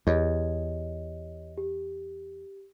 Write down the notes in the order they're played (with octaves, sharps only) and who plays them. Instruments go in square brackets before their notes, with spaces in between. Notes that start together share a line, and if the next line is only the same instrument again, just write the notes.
[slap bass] E2 [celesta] G4 C#5 D#5
[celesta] G4